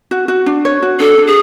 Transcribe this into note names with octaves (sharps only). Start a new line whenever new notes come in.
F#4
F#4
D4
C#5
F#4
D4 A4
D4
G#4